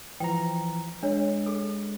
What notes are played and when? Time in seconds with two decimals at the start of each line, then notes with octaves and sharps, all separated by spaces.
0.20 E3 F3 G5 A#5
1.03 G#3 D4 C#5
1.46 G#4 A4